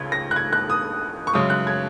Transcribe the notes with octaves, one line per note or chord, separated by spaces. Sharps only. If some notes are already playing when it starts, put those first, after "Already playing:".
Already playing: C#2 C#3 G#6
A#6
F#6
G#6
F#6
D#6
C#6
F#2 C#3 G#3 D#6
F#6
G#6